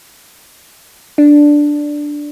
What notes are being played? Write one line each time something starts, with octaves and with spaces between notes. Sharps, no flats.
D4